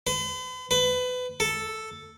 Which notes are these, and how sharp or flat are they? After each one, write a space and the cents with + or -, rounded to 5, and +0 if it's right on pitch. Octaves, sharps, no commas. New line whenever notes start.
B4 +45
B4 +25
A4 +0